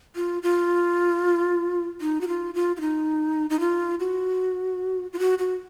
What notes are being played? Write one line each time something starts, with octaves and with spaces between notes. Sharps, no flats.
F4
F4
D#4
F#4
F4
F4
F4
D#4
D#4
F4
F#4
F4
F#4
F#4